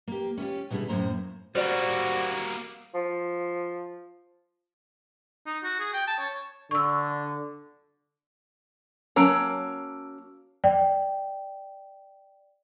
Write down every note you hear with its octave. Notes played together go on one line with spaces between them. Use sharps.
A#3 G4
C#4 E4 F4 G4
B2 D3 G3 E4 G#4
F#2 A2 F3 A#3 C5 A#5
G3 A#3 F#4 C5 D5
F3
D#4
F#4
G#4
G5
A5
C#5
D3 C#6 E6
F#3 A#3 C#4 A5 E6 D7
D5 G5